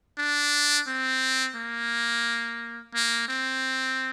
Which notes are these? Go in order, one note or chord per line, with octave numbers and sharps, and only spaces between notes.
D4
C4
A#3
A#3
C4